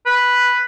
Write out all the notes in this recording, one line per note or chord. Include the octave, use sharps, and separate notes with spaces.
B4